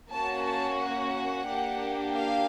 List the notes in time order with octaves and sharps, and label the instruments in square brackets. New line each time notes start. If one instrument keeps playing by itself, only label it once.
[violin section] A#3 C#4 F#4 A5
A5
F#5
A#3 D4 G4
F5